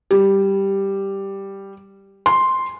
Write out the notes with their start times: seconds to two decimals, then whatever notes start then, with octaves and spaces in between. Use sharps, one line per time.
0.11 G3
2.26 C6